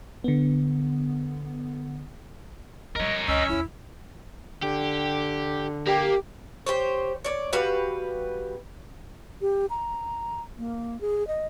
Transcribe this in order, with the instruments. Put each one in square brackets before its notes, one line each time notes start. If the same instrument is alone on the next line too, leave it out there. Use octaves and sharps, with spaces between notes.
[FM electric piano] D3 B3
[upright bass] G3 A3 [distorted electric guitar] A#4 C#5 [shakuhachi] D#5
[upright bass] C#2 D#4 [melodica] C#4 E6 [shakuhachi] D#5
[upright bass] A#1 E2 [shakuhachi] E4
[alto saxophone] D3 [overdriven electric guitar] G4
[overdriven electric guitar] A#3 [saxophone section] G4
[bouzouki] G4 C5 C#5
C#5 D5
G3 F#4 B4 F5
[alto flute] G4
A#5
A#3
G#4
D#5